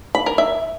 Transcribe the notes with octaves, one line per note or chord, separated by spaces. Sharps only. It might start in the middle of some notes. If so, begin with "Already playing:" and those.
B5
A#4
E5